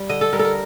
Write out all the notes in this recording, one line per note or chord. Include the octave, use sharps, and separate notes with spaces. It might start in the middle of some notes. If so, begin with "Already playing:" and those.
Already playing: G3
D3 D#5
A4
G3 A#4
A4
A#4